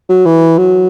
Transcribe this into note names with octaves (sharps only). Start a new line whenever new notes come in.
F#3
E3
F#3